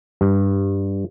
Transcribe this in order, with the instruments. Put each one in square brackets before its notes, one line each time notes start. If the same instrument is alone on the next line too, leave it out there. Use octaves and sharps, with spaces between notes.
[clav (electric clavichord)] G2